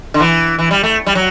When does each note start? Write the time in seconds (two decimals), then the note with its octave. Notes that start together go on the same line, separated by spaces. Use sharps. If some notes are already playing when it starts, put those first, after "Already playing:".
0.14 D3
0.20 E3
0.59 E3
0.71 G3
0.83 A3
1.07 G3
1.15 F#3